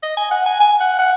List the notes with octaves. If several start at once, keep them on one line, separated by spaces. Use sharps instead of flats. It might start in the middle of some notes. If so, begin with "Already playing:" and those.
D#5
G#5
F#5
G#5
G#5
F#5
F#5